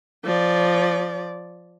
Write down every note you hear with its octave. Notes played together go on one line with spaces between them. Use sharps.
F3 D5